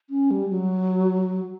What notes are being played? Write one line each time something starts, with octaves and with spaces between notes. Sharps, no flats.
C#4
G3
F#3